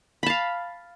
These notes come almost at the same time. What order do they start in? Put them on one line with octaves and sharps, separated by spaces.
B5 A5 F5